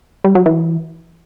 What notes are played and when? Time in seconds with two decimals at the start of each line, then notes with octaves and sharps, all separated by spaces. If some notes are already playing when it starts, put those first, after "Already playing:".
0.24 G3
0.35 F#3
0.46 E3